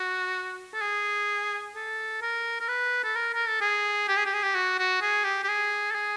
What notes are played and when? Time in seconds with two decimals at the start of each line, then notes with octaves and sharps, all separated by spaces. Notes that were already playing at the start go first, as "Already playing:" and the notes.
Already playing: F#4
0.73 A4
0.81 G#4
1.76 A4
2.22 A#4
2.60 A#4
2.68 B4
3.04 A4
3.15 A#4
3.34 A#4
3.48 A4
3.61 G#4
4.08 G4
4.17 G#4
4.26 G4
4.34 G#4
4.43 G4
4.55 F#4
4.78 F#4
5.01 G#4
5.24 G4
5.44 G4
5.48 G#4
5.91 A4
5.95 G#4